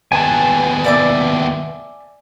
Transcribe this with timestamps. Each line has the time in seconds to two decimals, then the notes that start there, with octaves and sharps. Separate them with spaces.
0.12 D#2 B3 G#5 A5
0.84 D5 E5 D6